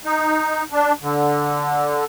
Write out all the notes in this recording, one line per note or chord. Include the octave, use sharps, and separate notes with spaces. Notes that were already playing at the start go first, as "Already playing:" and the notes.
D#4
D4
D3